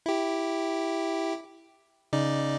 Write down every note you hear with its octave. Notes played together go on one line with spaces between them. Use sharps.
E4 G4
C#3 D#4 D5